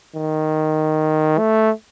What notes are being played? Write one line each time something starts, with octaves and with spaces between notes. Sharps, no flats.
D#3
A3